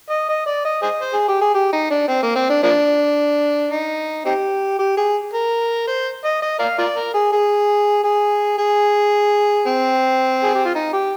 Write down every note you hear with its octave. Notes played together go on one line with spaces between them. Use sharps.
D#5
D#5
D5
D#5
G#4 C5 D#5
C5
G#4
G4
G#4
G4
D#4
D4
C4
A#3
C4
D4
F3 A#3 D4
D#4
C4 D#4 G4
G4
G#4
A#4
C5
D#5
D#5
A#4 D5 F5
F4 A#4 D5
A#4
G#4
G#4
G#4
G#4
C4
G#4
G4
F4
D#4
G4